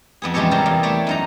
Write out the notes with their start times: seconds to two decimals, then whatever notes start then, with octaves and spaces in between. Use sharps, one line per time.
0.22 F2 B3 G#4
0.34 E2 C#3 G#3 G4 A4 C#5
0.51 C3 G3 F4 A#4
0.66 E2
0.83 A3 G4 C#5 D5 E5
1.07 F#2 D#4 A#5